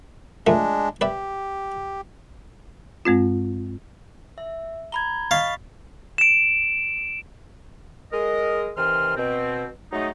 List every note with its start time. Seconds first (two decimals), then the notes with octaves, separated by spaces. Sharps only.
0.47 F3 G#3 A3 D4 A#4
1.01 G4 B4 D5 E5
3.05 G2 G#3 C4 F4
4.38 E5
4.92 A#5 B5 G#6 G7
5.31 D#5 F5 C#6 A6 B6
6.18 D7 E7
8.12 G#3 A#4 D#5
8.76 C3 D#3 E3 C6 F6
9.16 B2 C4
9.92 F#3 G#3 A3 D#4